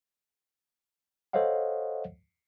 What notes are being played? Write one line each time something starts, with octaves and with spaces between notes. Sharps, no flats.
A4 C5 C#5 D#5 F5 F#5